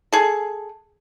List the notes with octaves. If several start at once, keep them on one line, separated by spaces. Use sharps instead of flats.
G#4 A4